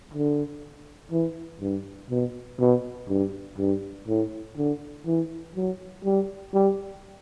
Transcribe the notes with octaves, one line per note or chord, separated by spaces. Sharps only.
D3
E3
G2
B2
B2
G2
G2
A2
D3
E3
F#3
G3
G3